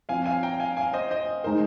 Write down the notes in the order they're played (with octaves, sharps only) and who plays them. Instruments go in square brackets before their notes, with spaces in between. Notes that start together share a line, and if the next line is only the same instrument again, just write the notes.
[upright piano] F3 C4 F4 [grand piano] F5 G#5
[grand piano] F5 G#5
G5 A#5
F5 G#5
F5 G#5
C5 D#5
C5 D#5
[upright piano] G#3 D#4 A#4 [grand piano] C5